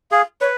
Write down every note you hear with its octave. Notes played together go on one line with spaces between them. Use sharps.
G#4 F5
B4 C#5